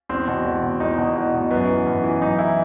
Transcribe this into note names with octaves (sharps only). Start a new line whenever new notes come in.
E2 C4
B2
E2
B2
E2 D#4
B2
E2
B2
F#2 B3
E3
F#2
E3
F#2 D#4
E3 E4